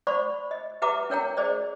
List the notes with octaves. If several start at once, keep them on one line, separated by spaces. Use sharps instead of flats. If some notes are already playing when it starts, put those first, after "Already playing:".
C5 D5 F#5 B5 C#6
D#5
G4 B4 E5 F#5 A#5 D6
C#4 A#4 C#5 F#5 G5 A#5
G#4 C5 D5 D#5